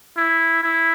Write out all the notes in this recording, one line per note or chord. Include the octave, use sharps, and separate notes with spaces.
E4
E4